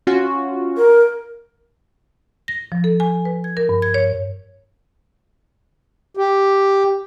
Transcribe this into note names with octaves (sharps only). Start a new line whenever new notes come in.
C#4 F4 F#4
A#4
A#6
F3
A4
G#5
B4
G#6
A#4
G2
G#6
C#5
G4